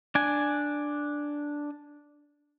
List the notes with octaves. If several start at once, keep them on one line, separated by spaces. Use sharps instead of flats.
D4 G#5